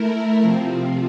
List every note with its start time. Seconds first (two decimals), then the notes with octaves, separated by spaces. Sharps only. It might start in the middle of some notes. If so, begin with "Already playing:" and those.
Already playing: A3 E4 A#4
0.41 C3 F3 C4